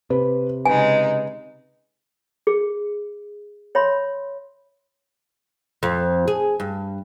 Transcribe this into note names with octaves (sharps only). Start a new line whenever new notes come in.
C3 B4
C#3 G#3 D#4 B4 G#5
G#4
C#5 E5 B5 C6
F2
G#4
G2